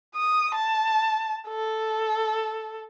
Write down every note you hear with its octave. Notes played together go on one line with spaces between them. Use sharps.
D#6
A5
A4